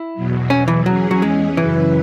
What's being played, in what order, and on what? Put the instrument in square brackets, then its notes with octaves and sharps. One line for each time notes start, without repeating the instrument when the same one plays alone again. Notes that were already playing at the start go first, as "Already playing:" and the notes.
Already playing: [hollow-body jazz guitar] E4
[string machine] E2 B2 F#3
[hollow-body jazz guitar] C#4
E3
[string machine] E2 E3 C#4 G#4 [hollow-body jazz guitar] F#3
[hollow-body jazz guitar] F#3
G#3
[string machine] F#2 C#3 F#3 E4 B4 [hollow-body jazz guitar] E3